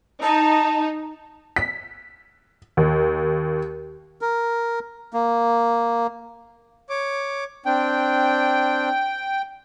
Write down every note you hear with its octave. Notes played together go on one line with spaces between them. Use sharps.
D#4 A5
B6
D#2
A#4
A#3
C#5 D6
C4 D4 G5